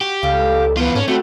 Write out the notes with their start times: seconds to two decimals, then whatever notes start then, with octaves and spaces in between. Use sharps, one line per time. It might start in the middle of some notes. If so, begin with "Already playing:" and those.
0.01 F#4 G4
0.23 C#2 G3 A4 F5
0.77 E3 B3 F4
0.95 G#2 C#4 D4 A4 A#4
1.08 D3 G3 A3 C4 F#4